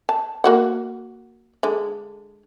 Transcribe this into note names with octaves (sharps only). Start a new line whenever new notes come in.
A5
A#3 F#4 F#5
D3 G#3